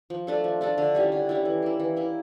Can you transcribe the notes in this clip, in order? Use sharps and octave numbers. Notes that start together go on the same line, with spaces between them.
F3
A3 D4 A4
F3
A3 D4 A4
D3
G3 C#4 E4
D3
G3 C#4 E4
E3
A#3 E4
E3
A#3 E4